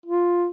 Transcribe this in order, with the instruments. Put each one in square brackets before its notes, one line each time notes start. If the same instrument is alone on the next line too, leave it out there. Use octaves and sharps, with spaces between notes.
[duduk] F4